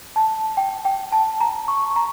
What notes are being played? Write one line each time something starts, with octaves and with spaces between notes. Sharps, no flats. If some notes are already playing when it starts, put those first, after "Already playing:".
A5
G5
G5
A5
A#5
C#6
A#5